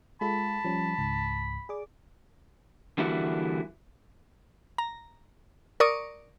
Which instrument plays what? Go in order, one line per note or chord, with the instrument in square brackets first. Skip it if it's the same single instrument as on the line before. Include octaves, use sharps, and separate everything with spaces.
[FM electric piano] G#3 F4 A4 [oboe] A5 [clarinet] B5
[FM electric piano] F3 G3 C#4
C#2 G#2
G#4 D5 D6
[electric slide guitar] D3 E3 G3 A#3 E4 F#4
[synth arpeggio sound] A#5
A#4 D5 C#6 D#6